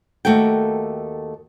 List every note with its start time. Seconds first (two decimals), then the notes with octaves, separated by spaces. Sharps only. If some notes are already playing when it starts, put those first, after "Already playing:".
0.25 D#2 A3 F#4 A#4 G5